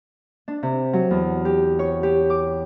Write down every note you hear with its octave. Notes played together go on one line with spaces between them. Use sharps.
D4
C3
F#3
E2
G4
C#5
G4
D6